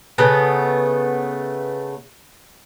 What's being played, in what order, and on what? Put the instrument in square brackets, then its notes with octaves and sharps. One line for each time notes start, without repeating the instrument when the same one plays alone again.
[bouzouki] C#3 A3 B3